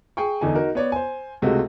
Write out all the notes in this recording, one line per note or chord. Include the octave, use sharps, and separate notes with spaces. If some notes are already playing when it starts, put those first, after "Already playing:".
G#4 G5 C#6
E2 D3 D#4 G#5
D#4 F#4 A#4
B3 C#5 D5
C5 G#5
C#2 C3 G#3 A3 F#4 D#5